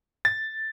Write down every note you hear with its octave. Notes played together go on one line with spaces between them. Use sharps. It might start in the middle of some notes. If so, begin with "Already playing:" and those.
A6